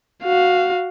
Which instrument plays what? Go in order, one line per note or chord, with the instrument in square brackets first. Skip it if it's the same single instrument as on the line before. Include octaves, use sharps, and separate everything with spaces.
[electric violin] F#4 F5